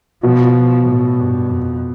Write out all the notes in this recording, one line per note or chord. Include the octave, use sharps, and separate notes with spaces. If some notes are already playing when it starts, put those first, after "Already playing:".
B2 F3
A2
G2
F2